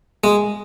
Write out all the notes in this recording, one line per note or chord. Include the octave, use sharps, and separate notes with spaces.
G#3